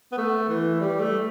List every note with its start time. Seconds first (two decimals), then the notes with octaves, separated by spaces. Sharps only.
0.12 B3
0.18 A3
0.49 E3
0.80 G3
1.00 A3